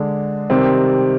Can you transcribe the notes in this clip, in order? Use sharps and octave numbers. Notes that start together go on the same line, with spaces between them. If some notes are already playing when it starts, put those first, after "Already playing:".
Already playing: D3 G#3 D4
C3 D#3 G3 C4